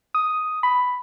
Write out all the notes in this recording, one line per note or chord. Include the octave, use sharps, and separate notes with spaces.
D#6
B5